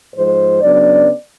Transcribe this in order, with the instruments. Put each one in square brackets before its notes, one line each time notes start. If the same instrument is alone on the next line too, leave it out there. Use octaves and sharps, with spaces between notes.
[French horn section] G#2 F3 G#3 C5
C#3 F#3 B3 D4 D5